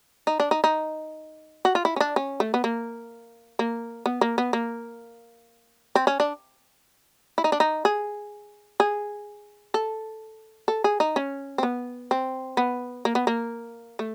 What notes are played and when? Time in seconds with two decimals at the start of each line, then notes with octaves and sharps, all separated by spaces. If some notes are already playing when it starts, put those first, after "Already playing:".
0.27 D#4
0.40 D4
0.51 D#4
0.64 D#4
1.65 F#4
1.75 F4
1.85 E4
1.96 C#4
2.01 D4
2.16 C#4
2.40 A3
2.54 B3
2.64 A#3
3.59 A#3
4.06 B3
4.21 A#3
4.38 B3
4.53 A#3
5.95 C4
6.07 C#4
6.20 D4
7.38 E4
7.44 D#4
7.52 D4
7.60 D#4
7.85 G#4
8.80 G#4
9.74 A4
10.68 A4
10.84 G#4
11.00 D#4
11.16 C#4
11.58 C4
11.63 B3
12.11 C4
12.57 B3
13.05 A#3
13.15 B3
13.27 A#3
13.99 A3